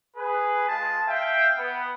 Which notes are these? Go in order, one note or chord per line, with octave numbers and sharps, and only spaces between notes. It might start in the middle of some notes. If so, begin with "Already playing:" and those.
G#4 B4
G#3 F4 A5
E5 F5 G5
B3